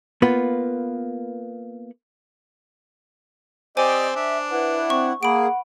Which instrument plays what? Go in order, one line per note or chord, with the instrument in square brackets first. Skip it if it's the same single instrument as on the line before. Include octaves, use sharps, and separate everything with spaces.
[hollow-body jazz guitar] A#3 B3 F4 B4
[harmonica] C4 G4 D5 [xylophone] C5 G#5 [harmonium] D#5
[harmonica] D4 [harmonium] E5
[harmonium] E4 F#5 [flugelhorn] B4
[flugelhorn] C4 [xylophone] C#6
[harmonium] A#3 G#4 [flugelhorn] F#5 [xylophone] B5 D7